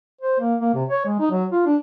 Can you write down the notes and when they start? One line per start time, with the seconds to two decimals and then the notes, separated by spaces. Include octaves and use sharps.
0.21 C5
0.40 A#3
0.61 A#3
0.74 C3
0.88 C#5
1.05 G#3
1.19 D#4
1.31 F#3
1.52 F4
1.66 D4